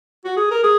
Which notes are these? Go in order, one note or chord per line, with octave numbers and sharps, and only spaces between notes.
F#4
G#4
A#4
G#4